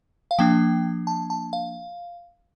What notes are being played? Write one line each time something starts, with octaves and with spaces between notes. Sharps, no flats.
F5
F3 A#3 D4 G5
A5
A5
F5